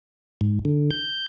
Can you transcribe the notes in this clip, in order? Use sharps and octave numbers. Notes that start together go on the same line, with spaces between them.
G#2
D3
G6